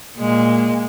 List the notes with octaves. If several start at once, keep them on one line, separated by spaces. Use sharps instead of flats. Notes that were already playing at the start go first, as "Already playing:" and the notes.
A#2 G#3